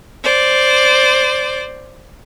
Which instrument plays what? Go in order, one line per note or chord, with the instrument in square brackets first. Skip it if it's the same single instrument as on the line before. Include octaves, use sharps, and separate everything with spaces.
[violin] C5 D5